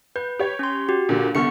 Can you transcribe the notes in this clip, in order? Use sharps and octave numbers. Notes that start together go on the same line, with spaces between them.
B4 G6
G4 C#5
C#4 C6
F#4 G4
A#2 D3
C2 D3 B3 A4 C#6 C#7